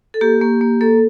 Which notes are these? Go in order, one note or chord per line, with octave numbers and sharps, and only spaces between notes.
A4
A#3 G4
A#3
A#3
A#3 A4